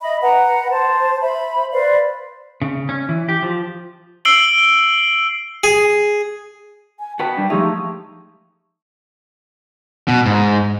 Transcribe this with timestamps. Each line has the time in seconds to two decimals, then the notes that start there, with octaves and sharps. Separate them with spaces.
0.01 D#5 E5 B5
0.22 B4 F#5 A#5
0.70 C5 A5
1.20 C5 E5 B5
1.73 B4 C5 D5 F5
2.62 C#3
2.89 C#4
3.09 E3
3.29 G4
3.43 F3
4.25 E6 C7 D7 F#7 G7
5.64 G#4
6.99 G#5
7.19 F#4 B4 G5 A5
7.37 G3 D4
7.50 F3 G#3 A3 D#4 G4
10.08 B2
10.26 G#2